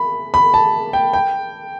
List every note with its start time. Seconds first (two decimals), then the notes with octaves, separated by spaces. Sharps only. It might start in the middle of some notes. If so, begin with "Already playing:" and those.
Already playing: B5
0.34 B5
0.54 A5
0.93 G5
1.13 G5